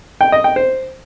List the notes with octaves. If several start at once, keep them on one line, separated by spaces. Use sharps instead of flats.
G5
D#5
G5
C5